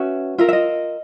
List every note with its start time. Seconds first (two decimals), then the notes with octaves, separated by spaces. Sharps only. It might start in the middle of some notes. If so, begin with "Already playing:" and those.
Already playing: C#4 F#4 B4 E5
0.38 F4 A#4 E5
0.48 E5
0.53 D#5